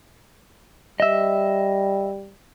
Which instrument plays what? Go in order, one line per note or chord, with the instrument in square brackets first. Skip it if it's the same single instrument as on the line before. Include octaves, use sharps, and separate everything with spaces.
[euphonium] G3 [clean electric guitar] D#5 E5